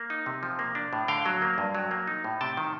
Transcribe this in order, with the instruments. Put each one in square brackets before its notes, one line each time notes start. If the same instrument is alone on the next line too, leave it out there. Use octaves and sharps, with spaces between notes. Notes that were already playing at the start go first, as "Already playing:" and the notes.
Already playing: [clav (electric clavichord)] A#3
D#4
C3
F3
A#3
D4
A2
D3 F5 G5
F#3
A#3
G2
F#3
A#3
D#4
A2
C3 G5 A5
D#3